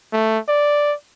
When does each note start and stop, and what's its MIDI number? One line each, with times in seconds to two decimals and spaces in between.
0.13 0.39 57
0.48 0.94 74